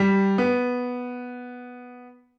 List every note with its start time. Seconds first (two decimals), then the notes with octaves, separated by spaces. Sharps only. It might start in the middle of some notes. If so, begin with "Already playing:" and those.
Already playing: G3
0.38 B3